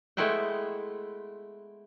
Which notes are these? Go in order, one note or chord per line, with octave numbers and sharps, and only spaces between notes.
G#3 A3 B3 E4 C5 G5